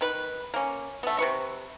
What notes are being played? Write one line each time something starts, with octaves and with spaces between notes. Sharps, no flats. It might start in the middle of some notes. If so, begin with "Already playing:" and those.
D#3 B4
A#3 C#4
A3 B3
C3 B4 C#6